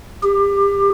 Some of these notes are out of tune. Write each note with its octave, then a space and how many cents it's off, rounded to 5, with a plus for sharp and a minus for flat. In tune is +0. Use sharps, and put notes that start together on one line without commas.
G4 +30